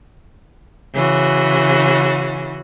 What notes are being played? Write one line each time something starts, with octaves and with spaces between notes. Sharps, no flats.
C#3 E3 F#4